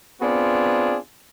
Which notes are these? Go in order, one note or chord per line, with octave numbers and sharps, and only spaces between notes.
B3 C4 D4 F4 G#4